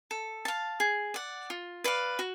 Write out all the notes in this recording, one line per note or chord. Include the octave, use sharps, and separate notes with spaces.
A4
F5 A5
G#4
D5 F#5
F4
B4 D5 F5
F#4